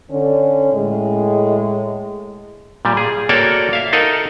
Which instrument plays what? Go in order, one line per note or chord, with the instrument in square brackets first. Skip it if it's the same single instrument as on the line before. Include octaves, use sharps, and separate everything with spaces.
[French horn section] D3 C#4
A2 G#3
[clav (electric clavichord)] A#2 G3
G#4
A#3 F#4 A4 C#5 D5 G5
E5 F5
D#4 A4 A#4 D#5 F#5